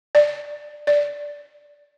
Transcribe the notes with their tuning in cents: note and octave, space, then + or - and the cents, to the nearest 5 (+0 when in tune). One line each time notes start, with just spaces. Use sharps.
D5 +15
D5 -10